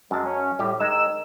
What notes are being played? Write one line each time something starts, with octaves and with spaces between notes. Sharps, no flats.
F#2 G#3 A5
C#4
A2 G3 G4
D#3 G#3 D#4 E6